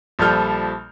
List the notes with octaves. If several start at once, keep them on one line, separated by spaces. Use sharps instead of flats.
A#1 F3 G3 A4 F6 G6